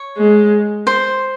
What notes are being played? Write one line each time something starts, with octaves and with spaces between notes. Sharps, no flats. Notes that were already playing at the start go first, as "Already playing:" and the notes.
Already playing: C#5
G#3
C5